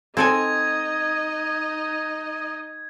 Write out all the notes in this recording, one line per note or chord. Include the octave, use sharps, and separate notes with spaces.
C4 D#4 A4 D#5 G#5 G#6